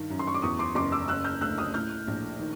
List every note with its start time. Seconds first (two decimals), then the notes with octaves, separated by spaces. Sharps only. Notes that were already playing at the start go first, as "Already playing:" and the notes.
Already playing: G2 D#3
0.10 F#2
0.19 C6
0.27 C#6
0.34 D6
0.42 E2 C#6 D#6
0.59 C6 D6
0.75 F#1 C6 D6
0.92 D6 E6
1.08 C#3 E6 F#6
1.24 F6 G6
1.41 D2 E6 F#6
1.58 D#6 F6
1.74 A2 F6 G6
2.07 A#1
2.39 D#3